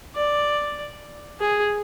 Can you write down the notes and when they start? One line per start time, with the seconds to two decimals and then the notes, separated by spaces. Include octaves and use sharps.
0.15 D5
1.40 G#4